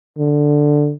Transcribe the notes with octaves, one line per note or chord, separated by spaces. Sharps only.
D3